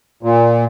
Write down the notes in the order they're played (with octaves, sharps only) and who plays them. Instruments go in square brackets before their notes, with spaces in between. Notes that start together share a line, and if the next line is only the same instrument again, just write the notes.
[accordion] A#2